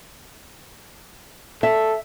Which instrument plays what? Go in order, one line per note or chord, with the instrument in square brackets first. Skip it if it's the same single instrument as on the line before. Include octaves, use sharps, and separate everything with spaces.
[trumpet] A4 [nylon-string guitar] E5